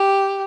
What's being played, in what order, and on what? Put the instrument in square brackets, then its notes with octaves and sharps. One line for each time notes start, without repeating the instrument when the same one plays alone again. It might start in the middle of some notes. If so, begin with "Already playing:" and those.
Already playing: [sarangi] G4